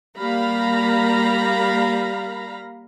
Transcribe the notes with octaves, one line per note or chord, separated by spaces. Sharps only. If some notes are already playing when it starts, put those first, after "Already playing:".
G3 A#3 F5 A#5 B5